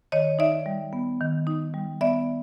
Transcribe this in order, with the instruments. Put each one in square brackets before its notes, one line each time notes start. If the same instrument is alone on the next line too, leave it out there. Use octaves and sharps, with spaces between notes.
[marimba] D#3 C#5 D#5
D#4 D5 E5
G3
B3
D#3
D#4
G3
B3 D5 E5